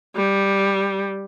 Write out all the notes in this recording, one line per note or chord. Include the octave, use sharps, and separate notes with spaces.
G3